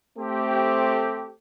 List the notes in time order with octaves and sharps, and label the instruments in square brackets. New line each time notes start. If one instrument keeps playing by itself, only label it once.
[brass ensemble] A3 C4 G4